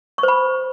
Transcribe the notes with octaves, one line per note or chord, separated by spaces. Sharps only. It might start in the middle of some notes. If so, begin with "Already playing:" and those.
C#6
C5
B5